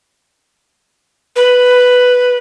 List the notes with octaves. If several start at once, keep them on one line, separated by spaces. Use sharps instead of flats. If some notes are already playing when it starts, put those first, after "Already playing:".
B4